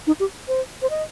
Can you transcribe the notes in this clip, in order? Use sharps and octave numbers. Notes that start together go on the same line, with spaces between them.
D#4
G4
C5
C5
D#5